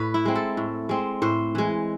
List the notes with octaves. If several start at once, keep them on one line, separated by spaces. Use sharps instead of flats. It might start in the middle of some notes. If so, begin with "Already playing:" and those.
Already playing: A2 B4
E4
G#3 C4
A4
A2
G#3 C4
A2 C5
E3 G#3